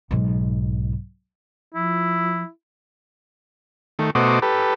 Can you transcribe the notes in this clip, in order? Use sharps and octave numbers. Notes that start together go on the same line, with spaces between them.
B1 G#2
F3 E4
D#3 A3
B2 A3 F#4 C5 D#5 D6
G4 A4 B4